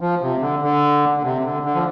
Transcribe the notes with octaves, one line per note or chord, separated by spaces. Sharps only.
F3
C3
D3
D3
D3
C3
D3
D3
F3